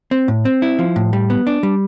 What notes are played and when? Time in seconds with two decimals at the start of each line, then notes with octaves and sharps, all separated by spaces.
0.11 C4
0.28 A2
0.45 C4
0.62 E4
0.79 F3
0.96 A2
1.13 G3
1.30 B3
1.47 D4
1.63 G3